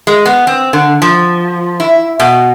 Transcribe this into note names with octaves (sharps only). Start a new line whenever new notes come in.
G#3
B3
C4
D3
F3
E4
B2